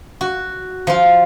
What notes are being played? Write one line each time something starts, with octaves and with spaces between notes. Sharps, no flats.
F#4
F3 F4